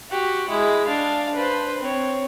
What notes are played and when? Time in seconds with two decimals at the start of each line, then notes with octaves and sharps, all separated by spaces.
0.10 F#4 G4
0.49 G#3 E4
0.86 D4 F5
1.35 B4 C5
1.81 C4 C#5